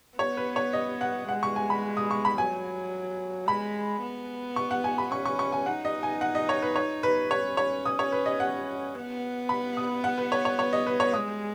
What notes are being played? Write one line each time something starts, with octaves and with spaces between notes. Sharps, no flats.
B3 C#5
B4
C#5
D#5
F#5
G#3 F#5
C#6
G#5
B5
D#6
C#6
B5
F#3 G#5
G#3 B5
B3
C#6
F#5
G#5
B5
C#4 C#6
C#6
C#6
G#5
D#4 F#5
D#5
G#5
F#5
D#5
C#5
B4
C#5
B4
C#4 C#5
C#5
D#6
C#5
B4
D#5
F#5
B3
B5
D#6
F#5
B4
C#5
C#5
C#5
D#5
B4
C#5
G#3 D#6